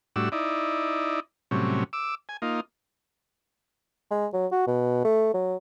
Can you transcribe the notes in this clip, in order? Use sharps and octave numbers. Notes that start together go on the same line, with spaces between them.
A2 G3 D4 F#4 E6
D#4 E4 D5
A2 C3 F#3 G3 C#4
D6 E6
G#5
A#3 D#4 F4
G#3
F#3
F#4
B2
A3
F#3